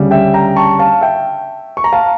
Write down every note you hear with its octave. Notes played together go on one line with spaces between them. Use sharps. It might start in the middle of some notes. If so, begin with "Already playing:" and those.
Already playing: D2 C#3 G3
E5 G5
G5 A#5
A5 C#6
F5 A5
E5 G5
C#6
A#5
F5 A5